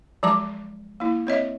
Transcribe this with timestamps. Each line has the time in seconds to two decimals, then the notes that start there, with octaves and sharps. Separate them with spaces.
0.23 F3 F#3 G#3 A5 A#5 D6
1.00 A#3 E4
1.27 C4 C#5 D#5 E5